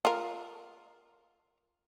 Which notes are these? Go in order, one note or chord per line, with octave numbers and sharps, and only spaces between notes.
F4 A#4